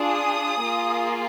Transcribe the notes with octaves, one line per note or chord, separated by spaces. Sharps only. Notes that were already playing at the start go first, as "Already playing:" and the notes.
Already playing: D4 F4 G#4
D#6
A#3 F4 G#4